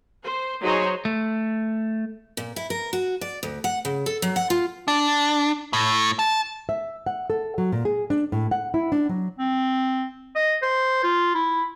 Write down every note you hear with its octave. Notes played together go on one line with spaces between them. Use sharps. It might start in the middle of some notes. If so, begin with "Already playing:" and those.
C5
F#3 D#4 F#4 G#4 C5 C#5
A3
A#2
E4
A#4
F#4
D5
D2
F#5
C#3
A4
F#3
F#5
F4
D4
A2
A5
E5
F#5
A4
F#3
A#2
G#4
D4
A2
F#5
E4
D4
F#3
C4
D#5
C5
F4
E4